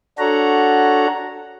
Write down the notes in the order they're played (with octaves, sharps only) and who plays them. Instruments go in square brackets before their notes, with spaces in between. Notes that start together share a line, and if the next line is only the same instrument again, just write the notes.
[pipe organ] D4 F#4 A4 C#5 F#5 A#5